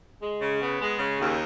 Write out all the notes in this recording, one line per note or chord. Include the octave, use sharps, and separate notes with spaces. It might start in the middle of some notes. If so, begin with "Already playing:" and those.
G#3
C#3
B3
G#3
C#3
D#2